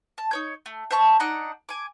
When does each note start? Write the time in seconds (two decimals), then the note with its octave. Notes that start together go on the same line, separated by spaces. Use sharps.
0.18 A5
0.31 D#4 C#5 G6
0.66 A3
0.91 C5 E5 A5 C#6
1.20 D4 D#4 F#5 A#5
1.69 G#5 D6